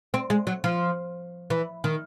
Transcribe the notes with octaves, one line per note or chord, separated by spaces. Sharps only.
C4
G#3
F#3
F3
E3
D#3